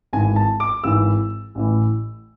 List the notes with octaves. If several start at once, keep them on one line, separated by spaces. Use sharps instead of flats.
G#1 G#2 E3 G#5
A5
D6
G#1 G#2 E3 E6
A1 A2 E3